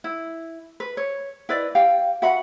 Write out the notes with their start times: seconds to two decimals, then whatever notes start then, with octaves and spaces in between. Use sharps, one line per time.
0.04 E4
0.80 B4
0.97 C#5
1.49 E4 B4 D5 D#5
1.75 G4 F5 G5
2.22 F#4 E5 F#5 B5